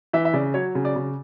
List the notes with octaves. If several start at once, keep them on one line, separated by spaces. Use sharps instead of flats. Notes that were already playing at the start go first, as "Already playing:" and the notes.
E3 E5
E5
C#3 D5
F#3 C#5
C#3
D5
C#3